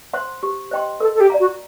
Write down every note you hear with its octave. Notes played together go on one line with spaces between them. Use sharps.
C5 F#5 C6
G4
C5 D#5 G5 C6
A4 A#4
A4
G4
D5 F#5 A#5
F#4